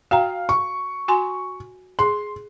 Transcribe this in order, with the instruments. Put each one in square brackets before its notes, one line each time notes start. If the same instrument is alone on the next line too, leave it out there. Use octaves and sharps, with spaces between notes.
[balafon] F#4 G5 A#5 [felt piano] F5
[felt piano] C#6
[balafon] F#4 G#5 C6
[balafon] G#4 [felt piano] C6